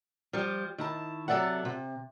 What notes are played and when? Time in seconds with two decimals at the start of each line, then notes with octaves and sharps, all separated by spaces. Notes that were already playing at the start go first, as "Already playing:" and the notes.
0.33 F3 G3
0.78 D#3 E4 A5
1.28 C3 F#3 A4 D5 E5 F#5
1.65 C3